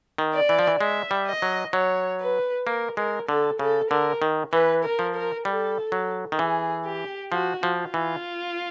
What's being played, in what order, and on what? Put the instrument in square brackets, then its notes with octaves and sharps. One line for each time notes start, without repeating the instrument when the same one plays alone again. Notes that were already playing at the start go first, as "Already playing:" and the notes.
[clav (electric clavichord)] D#3
[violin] D5
[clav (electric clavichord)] E3
F3
E3
[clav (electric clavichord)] G#3 [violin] E5
[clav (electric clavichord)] G3
[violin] D#5
[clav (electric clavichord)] F#3
[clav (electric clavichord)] F#3 [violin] C#5
[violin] B4
[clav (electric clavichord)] A#3 [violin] A#4
[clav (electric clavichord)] G#3 [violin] A#4
[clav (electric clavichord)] D3 [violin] A4
[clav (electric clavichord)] C#3 [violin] A4
[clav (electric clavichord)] D3 [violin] A#4
[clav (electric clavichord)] D#3
[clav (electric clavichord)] E3 [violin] B4
[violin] A#4
[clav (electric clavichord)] F3
[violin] A#4
[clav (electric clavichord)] G3 [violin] A4
[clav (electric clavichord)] F#3
D#3
[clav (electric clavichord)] E3 [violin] G#4
[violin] G4
[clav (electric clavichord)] F3 [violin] F#4
[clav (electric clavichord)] F3
[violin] F4
[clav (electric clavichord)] E3